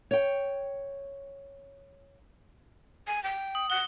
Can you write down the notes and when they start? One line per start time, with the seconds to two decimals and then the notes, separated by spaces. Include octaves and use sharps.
0.11 C#5 G5
3.07 G#5
3.24 G5
3.55 D#6
3.70 F#5 G7